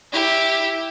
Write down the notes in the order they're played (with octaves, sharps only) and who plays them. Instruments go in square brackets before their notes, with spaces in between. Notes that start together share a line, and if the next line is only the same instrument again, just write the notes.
[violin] E4 G4